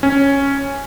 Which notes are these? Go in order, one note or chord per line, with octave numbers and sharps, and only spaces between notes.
C#4